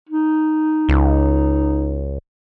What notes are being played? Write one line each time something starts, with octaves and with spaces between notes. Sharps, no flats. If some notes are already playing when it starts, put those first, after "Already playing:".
D#4
C#2